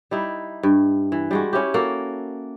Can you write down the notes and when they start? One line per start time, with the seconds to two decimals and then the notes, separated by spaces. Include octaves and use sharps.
0.11 G3 D#4 E4
0.63 G2
1.12 E3
1.31 G3 G#3 F#4
1.53 C#4 E4 G4
1.74 A#3 F#4 A4